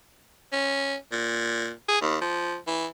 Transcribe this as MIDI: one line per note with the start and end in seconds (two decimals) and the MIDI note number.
0.52 0.96 61
1.12 1.71 46
1.89 2.00 68
2.01 2.17 39
2.21 2.57 53
2.68 2.87 52